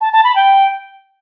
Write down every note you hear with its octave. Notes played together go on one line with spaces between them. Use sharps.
A5
A5
B5
G5